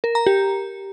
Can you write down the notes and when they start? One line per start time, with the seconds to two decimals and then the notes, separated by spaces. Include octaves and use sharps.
0.04 A#4
0.15 A#5
0.26 G4